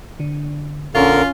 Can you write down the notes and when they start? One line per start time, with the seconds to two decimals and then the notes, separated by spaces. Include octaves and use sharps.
0.20 D3
0.95 A#1 D3 C#4 F4 A#4 C#6